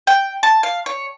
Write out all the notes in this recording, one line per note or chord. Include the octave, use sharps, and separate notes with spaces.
G5
A5
F5
C#5